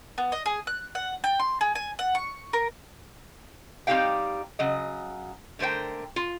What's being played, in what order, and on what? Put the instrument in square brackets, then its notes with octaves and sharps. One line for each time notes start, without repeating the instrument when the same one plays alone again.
[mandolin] B3
D#5
G#4
F#6
F#5
G5
C6
G#4
G#5
F#5
C#6
A#4
[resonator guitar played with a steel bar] G3 C4 D#4 G4 F5 G5
C#3 F#3 D#5
D3 A3 A#4 C5 G5
F4